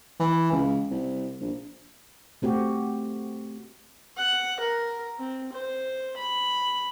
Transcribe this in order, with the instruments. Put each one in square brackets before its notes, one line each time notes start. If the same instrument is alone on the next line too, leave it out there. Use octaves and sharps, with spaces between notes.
[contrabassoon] E3
C#2
C2
A#1
[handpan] A3 C4 F#4 G4
[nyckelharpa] F#5
A#4
C4
C5
B5